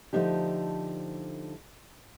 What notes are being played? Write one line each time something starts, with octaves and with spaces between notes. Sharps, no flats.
D3 F3 A3 D4 D#4 G4